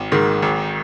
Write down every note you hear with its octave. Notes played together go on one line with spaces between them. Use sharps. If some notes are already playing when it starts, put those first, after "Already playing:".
Already playing: G#1
G#2 D#3
G#1